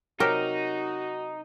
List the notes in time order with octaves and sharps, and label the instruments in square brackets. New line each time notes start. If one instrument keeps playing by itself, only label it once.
[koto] C3 F#3 G4 [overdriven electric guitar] D#4 [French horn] F#4 [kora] A#4